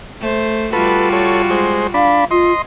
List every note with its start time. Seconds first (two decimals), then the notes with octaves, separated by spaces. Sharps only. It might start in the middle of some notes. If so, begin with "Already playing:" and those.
0.21 A3 C5
0.73 G3 F4 F#4 A4 B4
1.13 A4 C#5
1.50 G#3 C5
1.94 D4 F5 B5
2.31 F4 D#5 C6